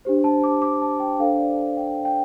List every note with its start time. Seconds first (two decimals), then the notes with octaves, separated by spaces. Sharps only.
0.05 D4 G4 C5
0.24 A5
0.44 D6
0.62 D6
0.82 A5
1.00 G5
1.19 D4 A4 C5 F5
1.38 D5
1.77 G5
2.05 G5